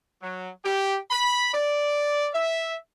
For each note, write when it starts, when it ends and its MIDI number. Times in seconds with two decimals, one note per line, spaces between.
0.22 0.49 54
0.65 0.98 67
1.10 1.53 83
1.54 2.28 74
2.33 2.74 76